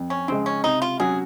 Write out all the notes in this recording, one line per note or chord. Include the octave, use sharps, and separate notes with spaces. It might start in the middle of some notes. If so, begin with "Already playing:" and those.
Already playing: F2
C#4
C#3 G#3 C4
C#4
C3 D#4
F4
F#3 C#4 F#4 G#4